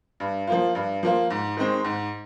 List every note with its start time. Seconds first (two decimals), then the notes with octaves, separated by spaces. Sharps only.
0.20 G2
0.47 F3 A#3 F4
0.75 G2
1.03 F3 A#3 F4
1.30 G#2
1.57 D#3 G#3 C4
1.85 G#2